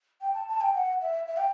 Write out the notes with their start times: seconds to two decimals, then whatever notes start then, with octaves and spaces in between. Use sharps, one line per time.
0.21 G5
0.34 A5
0.48 A5
0.61 G5
0.75 F#5
1.02 E5
1.27 E5
1.37 G5